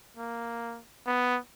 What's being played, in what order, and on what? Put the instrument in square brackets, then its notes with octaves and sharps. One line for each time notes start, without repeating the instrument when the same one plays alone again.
[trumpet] A#3
B3